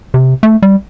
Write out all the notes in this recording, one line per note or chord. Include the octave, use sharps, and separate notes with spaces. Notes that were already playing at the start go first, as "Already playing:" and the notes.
C3
A3
G3